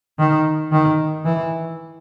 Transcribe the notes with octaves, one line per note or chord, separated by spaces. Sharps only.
D#3
D#3
E3